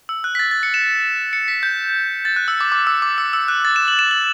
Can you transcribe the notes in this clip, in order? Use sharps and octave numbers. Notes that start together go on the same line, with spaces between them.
E6
F#6
B6
A6
A6
C#7
E7
C#7
B6
G6
A6
F#6
E6
D6
D6
E6
D6
E6
E6
F#6
A6
E7
F#7
E7
F#7